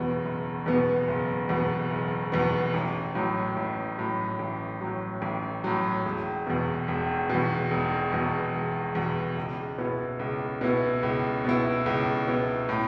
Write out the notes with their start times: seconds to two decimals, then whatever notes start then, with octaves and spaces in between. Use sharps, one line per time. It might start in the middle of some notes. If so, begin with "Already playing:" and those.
Already playing: F#1 E2 B2 B3
0.25 F#1
0.66 E2 B2 B3
1.08 F#1
1.49 E2 B2 B3
1.90 F#1
2.32 E2 B2 B3
2.74 A1
3.15 A2 F#3
3.57 A1
3.98 A2 F#3
4.39 A1
4.81 A2 F#3
5.22 A1
5.64 A2 F#3
6.05 E1
6.47 E2 B2
6.88 E1
7.30 E2 B2
7.71 E1
8.13 E2 B2
8.54 E1
8.95 E2 B2
9.37 C#2
9.78 B2 B3 E4
10.19 C#2
10.61 B2 B3 E4
11.03 C#2
11.45 B2 B3 E4
11.86 C#2
12.27 B2 B3 E4
12.69 A2